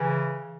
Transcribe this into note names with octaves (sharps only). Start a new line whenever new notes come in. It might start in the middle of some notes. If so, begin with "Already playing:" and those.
Already playing: C#3 E3